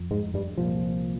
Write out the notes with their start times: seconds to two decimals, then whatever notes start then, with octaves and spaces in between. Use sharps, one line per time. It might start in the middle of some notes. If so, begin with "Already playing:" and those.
Already playing: F2
0.11 G#2 G#3
0.34 G2 G3
0.58 C2 A#2 F3